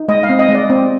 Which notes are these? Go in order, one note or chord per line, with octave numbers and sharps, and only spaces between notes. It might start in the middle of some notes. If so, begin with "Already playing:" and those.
Already playing: D#4
G#3 D#5
F5
C4
D#5
G#3
D5
C4